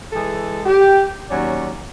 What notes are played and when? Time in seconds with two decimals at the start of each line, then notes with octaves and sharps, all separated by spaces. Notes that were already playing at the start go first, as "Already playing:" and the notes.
0.13 E3 G#3 G#4 A4
0.66 G4
1.29 D#2 F#3 C#4 D5